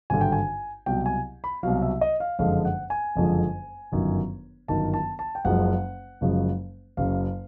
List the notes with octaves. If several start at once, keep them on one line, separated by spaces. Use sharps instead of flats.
G#1 G2 D3 G#5
G5
G#5
C2 B2 F#3 G5
G#5
B5
C2 B2 F#3 F5
E5
D#5
F5
F#1 F2 D3 F3 G#3 F5
F#5
G#5
F#1 F2 D3 F3 G#3
G1 F#2 D#3
G1 F#2 D#3 A5
A5
A5
G5
F#1 F#2 C#3 F3 G#3 F#5
F#1 F#2 C#3 F3 G#3
F#1 F#2 C#3 F5